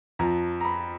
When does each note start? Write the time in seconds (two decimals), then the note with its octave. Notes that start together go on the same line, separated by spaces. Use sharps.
0.19 F2 F3 A#5
0.61 A#5
0.65 B5